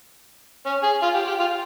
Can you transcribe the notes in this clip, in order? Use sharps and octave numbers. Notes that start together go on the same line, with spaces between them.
C#4
G#4
F4
G4
G4
F4